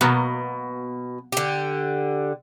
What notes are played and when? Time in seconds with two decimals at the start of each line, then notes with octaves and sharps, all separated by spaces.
0.01 B2 F#3 A#3 B3
1.32 D3 G4